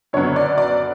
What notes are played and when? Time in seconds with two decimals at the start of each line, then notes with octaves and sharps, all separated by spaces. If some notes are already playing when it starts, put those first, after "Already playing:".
0.13 F#2 D3 F#3 B3 C#5
0.36 D5
0.58 D5